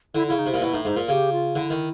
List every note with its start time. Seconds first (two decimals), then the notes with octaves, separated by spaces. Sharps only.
0.15 D3 E4
0.27 C#3 E4
0.39 D#4
0.46 C3 E4
0.54 A#2
0.61 B2 E4
0.73 A2 D#4
0.85 G#2 D#4
0.96 A#2 F4
1.08 C#3 G4
1.32 F4
1.55 D3 E4
1.70 D#3